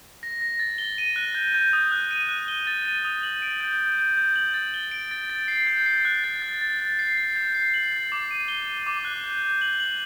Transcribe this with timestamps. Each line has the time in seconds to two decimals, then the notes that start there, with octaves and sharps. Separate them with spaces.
0.23 A#6
0.41 A#6
0.59 A6
0.78 G7
0.98 D#7
1.16 F#6
1.35 G6
1.54 G6
1.73 D#6
1.92 F#6
2.11 D#7
2.29 F#6
2.48 G7
2.67 A6
2.85 D#7
3.05 D#6
3.23 F#7
3.42 D7
3.61 G6
3.79 G6
3.98 G6
4.17 G6
4.36 F#7
4.54 A6
4.74 G7
4.91 D7
5.11 A6
5.30 A6
5.48 C7
5.67 G6
5.86 C7
6.05 F#6
6.24 A6
6.42 A6
6.61 A6
6.80 A6
6.99 C7
7.17 A6
7.36 G6
7.55 C7
7.74 F#7
7.92 A6
8.12 D6
8.31 D#7
8.48 G7
8.68 G7
8.87 D6
9.05 F#6
9.24 G6
9.42 G6
9.62 F#7
9.80 F#7